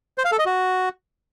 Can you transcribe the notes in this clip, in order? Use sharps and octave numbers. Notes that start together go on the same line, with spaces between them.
C5
F5
A4
D#5
F#4